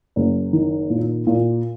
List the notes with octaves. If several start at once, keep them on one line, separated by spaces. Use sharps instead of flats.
F#1
D#3
A#2
A#2